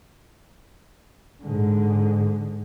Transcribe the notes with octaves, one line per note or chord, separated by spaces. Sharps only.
G#2 D3